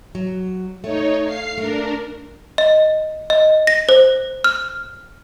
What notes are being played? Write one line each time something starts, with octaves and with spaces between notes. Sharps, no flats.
F#3
A3 D#4 C#5
F5 C7
A3 D4 A#4
D#5
D#5
A#6
C5
F6